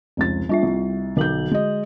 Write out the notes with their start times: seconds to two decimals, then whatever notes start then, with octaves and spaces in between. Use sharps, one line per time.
0.17 F1 C#2 A6
0.49 G3 D4 F4 E5
0.63 C2
1.17 B1 D3 F#4 G6 F#7
1.51 G#3 D#5